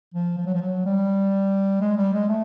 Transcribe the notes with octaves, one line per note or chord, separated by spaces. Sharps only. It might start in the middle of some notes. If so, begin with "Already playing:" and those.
F3
F3
F#3
F3
F#3
G3
G#3
G3
G#3
A3